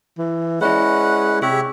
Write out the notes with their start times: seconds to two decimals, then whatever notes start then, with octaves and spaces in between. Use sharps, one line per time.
0.18 E3
0.61 G#3 C#4 E4 B4 D5 E5 F#5
1.42 C3 G4 G#4 C#5 E5